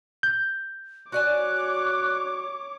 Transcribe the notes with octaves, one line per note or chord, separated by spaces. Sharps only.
G6
F#4 C#5 D5 G#5 D6 F#6